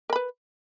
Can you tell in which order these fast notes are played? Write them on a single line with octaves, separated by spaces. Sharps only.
A#4 B5 B4